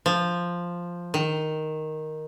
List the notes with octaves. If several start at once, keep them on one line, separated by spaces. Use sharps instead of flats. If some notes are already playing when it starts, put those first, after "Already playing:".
F3
D#3